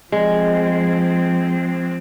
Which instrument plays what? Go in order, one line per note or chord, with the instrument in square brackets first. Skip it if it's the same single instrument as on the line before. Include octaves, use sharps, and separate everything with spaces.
[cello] F3 C4 [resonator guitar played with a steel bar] G#3